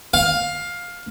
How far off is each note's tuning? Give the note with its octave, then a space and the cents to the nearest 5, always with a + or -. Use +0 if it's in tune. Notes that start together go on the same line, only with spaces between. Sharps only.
F5 +15